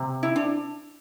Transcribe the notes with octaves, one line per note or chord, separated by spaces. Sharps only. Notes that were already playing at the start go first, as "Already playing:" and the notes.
Already playing: C3
E4
D4